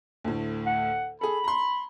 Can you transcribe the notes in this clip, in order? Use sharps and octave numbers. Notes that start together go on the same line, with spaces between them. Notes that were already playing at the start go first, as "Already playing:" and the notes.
D2 A2
F#5
G#4 A4 B5
A#5 C6